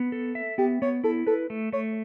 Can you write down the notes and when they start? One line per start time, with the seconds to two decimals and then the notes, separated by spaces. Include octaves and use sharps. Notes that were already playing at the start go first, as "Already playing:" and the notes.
Already playing: B3
0.12 A4
0.35 E5
0.58 B3 G4
0.82 B3 C#5
1.04 E4 A4
1.27 A4 B4
1.50 A3
1.73 A3 C#5